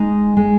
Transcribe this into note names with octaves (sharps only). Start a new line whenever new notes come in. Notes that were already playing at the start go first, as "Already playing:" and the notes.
Already playing: G#3 D#4
G#3